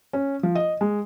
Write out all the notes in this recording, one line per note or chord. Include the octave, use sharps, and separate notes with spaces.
C#4
F3
D#5
G#3